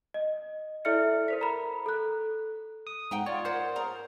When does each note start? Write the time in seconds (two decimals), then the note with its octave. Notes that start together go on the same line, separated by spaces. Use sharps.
0.14 D#5
0.85 E4 A4 D5 E5 F6 C#7
1.28 A#4 C5 B6
1.41 A#5 B5
1.86 A4 F#6
2.87 D#6
3.11 G#2 F#5 G5 A#5
3.26 F4 C#5 D5
3.45 A#4 C5 D5 F#5
3.76 G#4 A#4 A#5